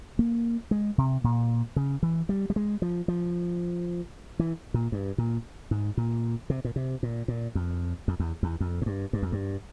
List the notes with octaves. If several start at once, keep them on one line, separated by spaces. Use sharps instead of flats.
A#3
G#3
C3
A#2
C#3
E3
G3
G3
G#3
F3
F3
E3
A#2
G2
A#2
G#2
A#2
C3
A#2
C3
A#2
A#2
F2
F2
E2
E2
F2
G#2
G2
G2
F2
G2